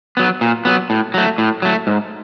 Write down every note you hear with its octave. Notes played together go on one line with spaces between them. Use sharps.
F#3 B3
A#2
F#3 B3
A2
F#3 A3
A2
F#3 A3
G#2